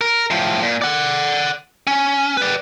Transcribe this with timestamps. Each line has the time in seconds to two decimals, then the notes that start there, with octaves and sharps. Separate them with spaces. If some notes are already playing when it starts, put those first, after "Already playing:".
0.01 A#4
0.31 A2 F3
0.62 A#2
0.82 D5 F#5
1.87 C#4
2.37 B4 D5